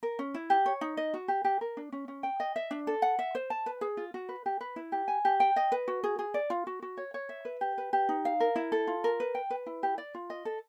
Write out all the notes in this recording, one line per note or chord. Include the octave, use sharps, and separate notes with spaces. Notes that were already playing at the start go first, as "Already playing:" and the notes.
A#4
C#4
E4
G4
C#5
D#4
D#5
F#4
G4
G4
A#4
D4
C#4
C#4
G5
D#5
E5
D4
A4
F#5
E5
C5
A5
B4
G#4
F4
F#4
B4
G4
B4
E4
G4
G#5
G4
G5
D#5
B4
F#4
G#4
G#4
D5
F4
F#4
F#4
C#5
C#5
E5
B4
G4
B4
G4
D#4
F5
A#4
E4
A4
F4
A#4
B4
G5
B4
E4
G4
D5
F4
D#5
A4